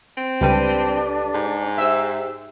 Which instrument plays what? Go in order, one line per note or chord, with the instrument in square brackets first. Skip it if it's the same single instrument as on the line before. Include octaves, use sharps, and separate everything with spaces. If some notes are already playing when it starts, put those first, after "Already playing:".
[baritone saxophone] C4
[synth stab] C#2 G3 D#7 [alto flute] D4 [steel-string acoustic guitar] G4 A4 B4
[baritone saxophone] G#2
[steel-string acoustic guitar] G4 C5 [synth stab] E5 E6